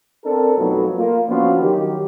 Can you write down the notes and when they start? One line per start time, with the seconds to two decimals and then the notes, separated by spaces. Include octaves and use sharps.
0.25 C4 D4 A4 A#4
0.57 F2 B2 F#3 A3 B3 D#4
0.97 A#3 F4
1.28 F3 B3 C#4 D4 F4 F#4
1.61 D#3 F#3 G4